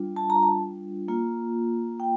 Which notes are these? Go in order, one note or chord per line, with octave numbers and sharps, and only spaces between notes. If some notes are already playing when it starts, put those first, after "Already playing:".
Already playing: G3 D4 F4
A5
A#5
A5
A#3 F4
G5